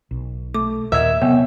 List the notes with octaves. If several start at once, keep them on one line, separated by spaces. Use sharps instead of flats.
B1
A3 D6
D#2 A#2 A#4 D#5 E5 G#6
C3 F#3 B3 C#5 G5 G#5